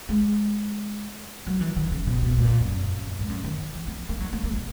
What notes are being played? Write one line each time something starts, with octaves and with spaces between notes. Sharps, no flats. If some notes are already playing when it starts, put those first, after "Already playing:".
G#3
F#3
E3
D#3
C#3
B2
B2
A#2
F#2
F#2
E2
G#2
F#2
D#3
D#3
E3
B3
A#3
F#3
A#3
A#3
B2